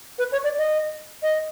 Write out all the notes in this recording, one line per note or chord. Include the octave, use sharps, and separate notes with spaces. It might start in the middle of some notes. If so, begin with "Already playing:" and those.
B4
C#5
D5
D#5
D#5